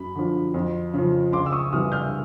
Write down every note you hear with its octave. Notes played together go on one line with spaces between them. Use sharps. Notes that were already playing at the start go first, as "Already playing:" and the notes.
Already playing: F#2 B5
D3 F3
F2
C#3 F3
C#2 C6 D6
E6
C#6 D#6
C3 E3 G3 D#6 F6
F6 G6